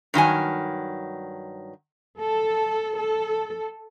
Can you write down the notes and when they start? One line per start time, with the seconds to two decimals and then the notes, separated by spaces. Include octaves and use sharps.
0.14 G2 D#3 F#3 G#5
2.20 A4
2.97 A4